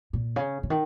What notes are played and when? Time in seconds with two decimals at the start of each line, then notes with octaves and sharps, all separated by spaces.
0.13 A#2
0.36 C#3
0.63 C#3
0.70 D#3